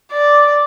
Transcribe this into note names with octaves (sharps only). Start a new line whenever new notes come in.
D5